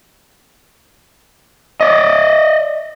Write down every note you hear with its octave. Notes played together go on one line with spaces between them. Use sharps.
D5 D#5